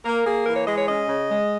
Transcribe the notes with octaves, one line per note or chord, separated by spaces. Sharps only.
A#3 A#4
A#3 G#4
E3 A#4
C#5
G#3 D#5
C#5
C#4 D#5
C#3
G#3